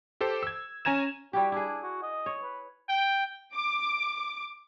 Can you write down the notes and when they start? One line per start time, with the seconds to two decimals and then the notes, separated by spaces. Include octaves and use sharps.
0.21 G4 A4 C5
0.43 E6 G#6
0.85 C#4 G#5 A#5 G#6 E7
1.33 G3 E4 F#4 G4
1.52 D4 E4 G#4
1.83 F#4
2.03 D#5
2.26 C#5
2.43 B4
2.89 G5
3.53 D6